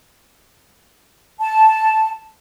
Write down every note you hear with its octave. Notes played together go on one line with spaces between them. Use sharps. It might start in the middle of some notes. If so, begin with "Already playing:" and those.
A5